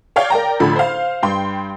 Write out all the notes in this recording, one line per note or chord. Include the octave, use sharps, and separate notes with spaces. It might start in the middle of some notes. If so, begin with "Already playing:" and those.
C#5 D5 F5 G5
A#4 D5 G5 A#5
A1 D3 F3 A4 B5
C5 F5
G2 G5 C6